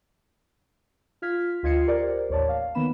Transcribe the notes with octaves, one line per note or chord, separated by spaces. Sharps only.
F4 F6 G#6 B6
D2 F4 D#5 G#6 C7 C#7
G4 A#4 C5 D5
A1 D#2 C#5 D5 A5
F5
D#3 A#3 B3 B5 E7